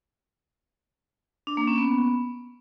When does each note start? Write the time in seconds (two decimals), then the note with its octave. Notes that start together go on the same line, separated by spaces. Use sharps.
1.47 D4
1.57 A#3
1.67 C#4
1.78 B3